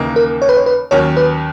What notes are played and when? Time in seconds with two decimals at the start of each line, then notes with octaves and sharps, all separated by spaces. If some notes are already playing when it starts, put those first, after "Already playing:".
Already playing: D#2 C#3 E3 A#3 D#4
0.16 A#4
0.42 C#5
0.49 B4
0.57 C#5
0.66 B4
0.91 D#2 D#3 F#3 C#4 C#5
1.17 B4